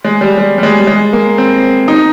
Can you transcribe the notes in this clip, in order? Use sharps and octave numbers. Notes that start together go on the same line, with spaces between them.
G#3
G3
G3
G3
G#3
G3
G#3
A#3
C4
D#4